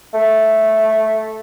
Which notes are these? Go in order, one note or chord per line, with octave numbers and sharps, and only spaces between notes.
A3